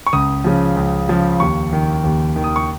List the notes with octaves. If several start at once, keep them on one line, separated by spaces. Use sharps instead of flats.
C#6
C#2 D#6
C#3 F3
C#2
C#3 F3
D#2 C#6
D#3
D#2
D#3
D#6
C#6